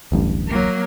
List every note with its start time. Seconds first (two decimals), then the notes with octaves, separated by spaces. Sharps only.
0.12 D1 A1 G2
0.48 F#3 A#3